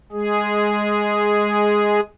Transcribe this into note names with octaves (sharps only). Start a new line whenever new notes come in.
G#3 G#4